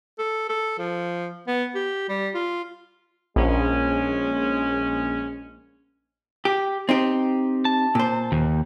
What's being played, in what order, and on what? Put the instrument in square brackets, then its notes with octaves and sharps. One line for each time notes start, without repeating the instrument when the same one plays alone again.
[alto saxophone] A4
A4
F3
B3
G4
G3
F4
[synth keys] A#1 [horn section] G#3 C#4
[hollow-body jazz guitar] G4
C4 D#4 G4
[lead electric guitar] A5
[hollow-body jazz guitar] A#2 C5
[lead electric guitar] D#2